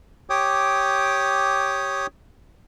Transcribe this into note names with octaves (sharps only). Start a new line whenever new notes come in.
G4 C#5 G5 D6 D#6